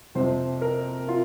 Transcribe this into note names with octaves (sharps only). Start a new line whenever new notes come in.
F2 C3 F3 C4 C5
A#4
F4